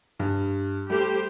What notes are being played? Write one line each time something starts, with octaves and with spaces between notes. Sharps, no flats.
G2
G3 A3 G4 C5